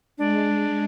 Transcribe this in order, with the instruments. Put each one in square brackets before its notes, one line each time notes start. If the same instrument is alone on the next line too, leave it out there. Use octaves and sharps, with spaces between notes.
[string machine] G#3 [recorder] D4